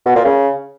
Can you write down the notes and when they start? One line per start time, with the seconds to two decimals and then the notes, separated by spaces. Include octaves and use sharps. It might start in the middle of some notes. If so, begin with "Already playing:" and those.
0.06 B2
0.15 A#2
0.25 C#3